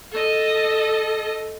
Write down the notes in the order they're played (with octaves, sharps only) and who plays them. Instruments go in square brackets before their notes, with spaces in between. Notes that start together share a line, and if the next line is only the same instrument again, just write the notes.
[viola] A4 D#5